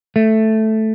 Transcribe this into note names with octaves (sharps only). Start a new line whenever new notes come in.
A3